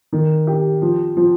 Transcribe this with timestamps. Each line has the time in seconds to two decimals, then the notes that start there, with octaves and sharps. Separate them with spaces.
0.13 D#3
0.47 G4
0.82 F3
1.17 F3